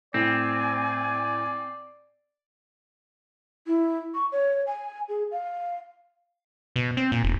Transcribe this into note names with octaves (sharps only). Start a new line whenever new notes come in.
A2 C4 D5 G#5
E4
C#6
C#5
G#5
G#4
F5
B2
C4
A#2
E1